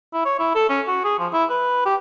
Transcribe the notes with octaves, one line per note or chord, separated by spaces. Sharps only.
E4
C#5
E4
A4
C#4
F#4
G#4
F3
E4
B4
G4